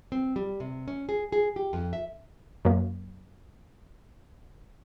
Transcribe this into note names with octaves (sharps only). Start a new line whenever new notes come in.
C4
G3
C3
C#4
G#4
G#4
G4
F2
E5
F#2 A#3